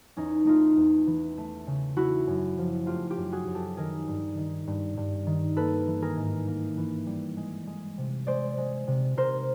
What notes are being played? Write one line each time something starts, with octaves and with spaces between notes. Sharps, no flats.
E2 C#4 D#4
A3 D#4 F4
E2
E3
A3
C#3
A3 E4 F#4
F#2
F3
A3 F4 G4
F4 G4
F#2
F#4 G#4
F#2
G4 A4
D#3 G#4 A#4
G2
D#3
G2
G2
D#3
A#3 A4 B4
E3
G#4 A#4
G#2
A#3
E3
G3
G#3
G#3
C3
G#3 C5 D5
G#3
C3
C3 A#4 C5